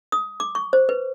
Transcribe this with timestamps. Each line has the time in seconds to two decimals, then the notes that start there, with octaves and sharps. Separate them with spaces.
0.12 D#6
0.40 D6
0.55 C#6
0.73 C5
0.89 B4